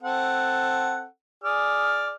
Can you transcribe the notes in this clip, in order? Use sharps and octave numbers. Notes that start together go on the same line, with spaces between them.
C4 A4 F#5
G#4 D5 F6